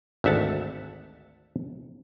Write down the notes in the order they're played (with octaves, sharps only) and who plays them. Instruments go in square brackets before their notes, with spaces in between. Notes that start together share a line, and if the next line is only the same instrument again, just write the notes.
[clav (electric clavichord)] G#1 D2 E5 F#5 A5